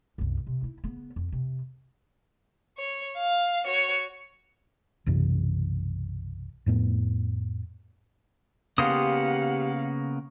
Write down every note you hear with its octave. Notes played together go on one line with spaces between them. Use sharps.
C2 F#2
C3
D#4 E4
C#3 B3
F2
C3
C#5
F5
F#4 C#5
B1 F#2 C3 E3
F2 A2 B3
C#3 A#3 B3 G4 F5 F#5 C6 D#6